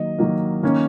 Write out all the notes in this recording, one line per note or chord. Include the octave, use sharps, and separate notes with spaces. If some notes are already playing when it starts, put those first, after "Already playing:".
Already playing: D#3 F#3 A#3 D#5
D#3 F#3 A#3
D#3 A#3 C#4